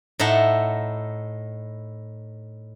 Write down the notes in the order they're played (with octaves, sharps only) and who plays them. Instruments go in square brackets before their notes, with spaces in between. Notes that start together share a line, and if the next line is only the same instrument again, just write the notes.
[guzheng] A2 D#4 E5 F#5 A5